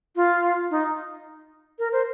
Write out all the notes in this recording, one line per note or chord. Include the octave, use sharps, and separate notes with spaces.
F4
D#4
A#4
C5